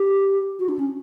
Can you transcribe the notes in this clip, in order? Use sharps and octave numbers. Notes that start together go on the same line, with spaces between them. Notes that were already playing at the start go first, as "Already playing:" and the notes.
Already playing: G4
F#4
D4
C#4